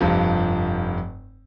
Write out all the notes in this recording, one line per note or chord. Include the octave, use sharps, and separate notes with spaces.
F1 G2 F3